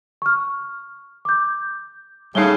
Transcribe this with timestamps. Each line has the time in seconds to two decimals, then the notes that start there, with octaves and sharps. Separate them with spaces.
0.22 C#6 F6
1.25 D6 G6
2.35 D#2 A2 C#3 G3 D#4 C7 G7